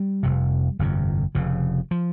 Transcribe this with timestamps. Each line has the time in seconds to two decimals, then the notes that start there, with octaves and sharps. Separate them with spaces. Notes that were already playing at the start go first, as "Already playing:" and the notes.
Already playing: G3
0.23 F1 F2 C3
0.79 G1 F2 C3
1.35 F1 F2 C#3
1.91 F3